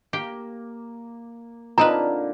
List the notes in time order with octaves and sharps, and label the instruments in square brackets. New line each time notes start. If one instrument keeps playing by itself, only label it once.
[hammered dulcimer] A#3 [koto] G4
[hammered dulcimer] A#2 D3 A#3 [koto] C4 D#4 B4 [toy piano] A#5